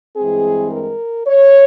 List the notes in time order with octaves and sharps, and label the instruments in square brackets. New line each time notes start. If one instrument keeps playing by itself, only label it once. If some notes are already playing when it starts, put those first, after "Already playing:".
[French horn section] G2 E3 G#3 C4 G#4
A#4
C#5